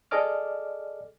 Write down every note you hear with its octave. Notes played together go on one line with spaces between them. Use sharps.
G#4 A4 D5 D#5 D6 F6